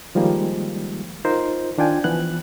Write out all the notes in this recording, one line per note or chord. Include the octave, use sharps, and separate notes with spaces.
D#3 F3 G3 G#3 A#3
D#4 F4 A#4 C5
D#3 D4 F4 G5 G#5
E3 F3 B3 F#6